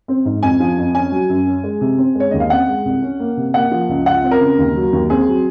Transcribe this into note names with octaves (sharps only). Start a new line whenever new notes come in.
C4
G#2
F2 G#5
F3
F2
C#4 G#5
F#3
F#2
C#4
G#3
C3
C4
G#3
C#5
D#2 D#5
F5
C4 F#5
G#3
C2
C#4
A#3
C3
A#3 F#5
F3
C#2
F4 F#5
C4
A#4
C#3
D#2
F#3
D#2
C4 G#4
F#3